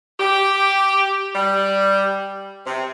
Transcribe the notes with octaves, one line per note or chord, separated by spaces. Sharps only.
G4
G3
C3